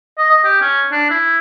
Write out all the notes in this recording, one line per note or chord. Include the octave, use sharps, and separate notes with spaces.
D#5
D#5
G4
C#4
D4
E4